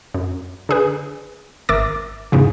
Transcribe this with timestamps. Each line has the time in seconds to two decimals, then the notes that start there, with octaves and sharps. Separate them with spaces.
0.14 F#2
0.69 D3 G#4 B4
1.69 G#1 A#4 E5 D6 A6
2.32 E2 G#2 C#3 F3